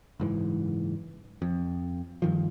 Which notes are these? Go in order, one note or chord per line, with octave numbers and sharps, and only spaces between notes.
F#1 G#2 E3
F2
G2 D#3 F3